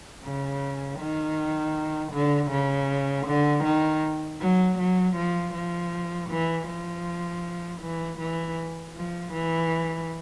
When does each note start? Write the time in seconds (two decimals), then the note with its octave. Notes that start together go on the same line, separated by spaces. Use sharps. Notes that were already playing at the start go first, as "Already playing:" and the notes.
0.24 C#3
0.99 D#3
2.13 D3
2.51 C#3
3.27 D3
3.64 D#3
4.40 F#3
4.79 F#3
5.16 F3
5.54 F3
6.30 E3
6.68 F3
7.81 E3
8.19 E3
8.96 F3
9.33 E3